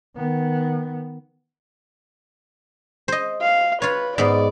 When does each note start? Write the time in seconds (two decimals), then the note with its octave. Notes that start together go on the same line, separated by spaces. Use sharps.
0.16 D#3 B3
3.08 C5 D#5
3.41 F5
3.82 F4 B4 C#5
4.18 G#2 B3 D5